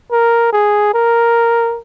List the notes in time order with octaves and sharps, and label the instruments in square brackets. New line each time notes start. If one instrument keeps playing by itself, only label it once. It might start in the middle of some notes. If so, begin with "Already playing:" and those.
[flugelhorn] A#4
G#4
A#4